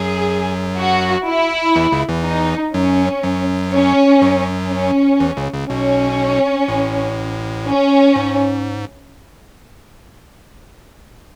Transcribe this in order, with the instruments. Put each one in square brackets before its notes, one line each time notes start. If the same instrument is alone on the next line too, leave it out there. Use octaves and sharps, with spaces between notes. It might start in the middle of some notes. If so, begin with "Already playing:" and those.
Already playing: [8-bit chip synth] F#2 F#3 [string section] G#4
[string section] F#4
E4
[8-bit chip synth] E2 E3
C#2 C#3
E2 E3
[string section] D#4
[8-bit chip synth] F#2 F#3 [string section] C#4
[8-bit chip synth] F#2 F#3
[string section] C#4
[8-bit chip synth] F#2 F#3
[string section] C#4
[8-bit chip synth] E2 E3
C#2 C#3
C#2 C#3
[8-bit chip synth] B1 B2 [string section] C#4
[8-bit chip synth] A1 A2
[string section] C#4
[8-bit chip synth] G#2